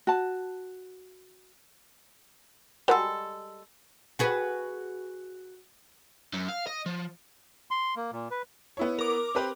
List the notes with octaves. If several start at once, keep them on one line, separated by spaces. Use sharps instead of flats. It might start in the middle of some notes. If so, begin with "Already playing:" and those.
F#4 A5
G3 G#3 F#4 A4 A#4
F#4 G#4 B4
F#2
F5
D#5
F3
C6
A#3
A#2
B4
B3 E4 C#5
A#4 D6
C4 G4 B4